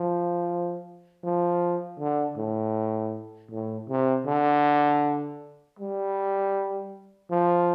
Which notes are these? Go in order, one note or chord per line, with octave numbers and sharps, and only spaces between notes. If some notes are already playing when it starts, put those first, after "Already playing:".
Already playing: F3
F3
D3
A2
A2
C3
D3
G3
F3